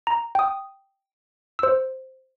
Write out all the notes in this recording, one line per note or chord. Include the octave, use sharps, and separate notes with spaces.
A#5
G5 D#6
C5 E6